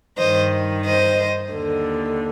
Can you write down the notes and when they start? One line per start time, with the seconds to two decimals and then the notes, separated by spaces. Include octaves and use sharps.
0.18 G2 D#3 C5 D#5
0.85 C5 D#5
1.52 D#2 D3